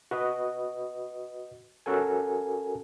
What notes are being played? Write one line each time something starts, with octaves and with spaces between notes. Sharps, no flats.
F#4 B4 D#5
C#4 F#4 A4 A#4 G#5